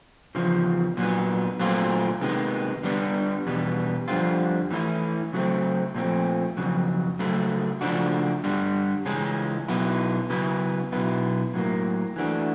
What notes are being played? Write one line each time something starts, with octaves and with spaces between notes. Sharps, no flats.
E2 C#3 F3
A#2 F#3 B3
A#2 F#3 A3 C4 F4
C3 D#3 G#3 B3
D3 G3 B3 D4
E2 B2 G3 B3
F2 D3 G3 C4 F4
E3 A3 C#4 E4
C#3 F#3 A3 C4
A#2 F3 A3 C4
F2 C#3 F#3
C#3 F#3 A3
C#3 F3 A3 D4 F#4
G2 D3 G3
C#3 E3 G#3 C#4
B2 F#3 B3 E4
C#3 F#3 B3 E4
B2 F#3 B3 E4
A2 F#3 A#3
E3 A3 D4 F#4